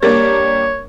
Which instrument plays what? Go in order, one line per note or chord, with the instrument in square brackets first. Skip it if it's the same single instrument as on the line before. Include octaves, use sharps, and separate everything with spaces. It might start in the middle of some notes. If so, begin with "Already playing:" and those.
[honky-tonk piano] G3 A#3 D4 [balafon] A#4 [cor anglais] C#5